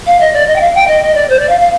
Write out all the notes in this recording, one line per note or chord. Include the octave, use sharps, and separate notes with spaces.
F5
D#5
D5
D#5
G5
F5
G5
D#5
D#5
D5
C5
D5
F5
F5